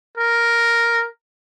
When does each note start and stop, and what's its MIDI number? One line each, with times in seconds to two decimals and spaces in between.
0.17 1.06 70